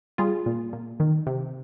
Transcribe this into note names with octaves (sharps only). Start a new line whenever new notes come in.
G3 F4 G#4
A#2
A#2
D#3
C3